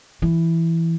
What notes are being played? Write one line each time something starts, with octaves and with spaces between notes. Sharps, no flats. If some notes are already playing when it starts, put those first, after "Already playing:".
E3